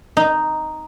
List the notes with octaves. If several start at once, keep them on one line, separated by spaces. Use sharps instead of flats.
D#4